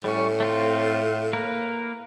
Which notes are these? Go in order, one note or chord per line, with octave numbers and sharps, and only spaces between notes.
A2 G3 C#4
A3 C4 F4
A#3 A#4 B4